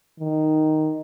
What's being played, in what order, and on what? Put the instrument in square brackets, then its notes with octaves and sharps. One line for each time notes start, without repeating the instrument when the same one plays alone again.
[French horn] D#3